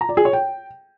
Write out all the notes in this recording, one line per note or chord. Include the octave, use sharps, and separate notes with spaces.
A#5
D5
G#4
C#5
G5